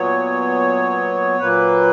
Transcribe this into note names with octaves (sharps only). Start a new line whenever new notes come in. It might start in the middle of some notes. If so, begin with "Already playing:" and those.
Already playing: A#2 F#3 B3 C#5
A#2 F#3 A#3 B4